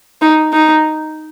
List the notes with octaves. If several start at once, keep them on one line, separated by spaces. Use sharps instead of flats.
D#4
D#4